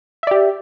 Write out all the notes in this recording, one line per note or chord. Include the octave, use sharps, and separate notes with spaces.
G4 D5 E5